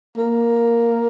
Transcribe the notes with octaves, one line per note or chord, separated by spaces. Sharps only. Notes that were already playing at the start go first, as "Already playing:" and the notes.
A#3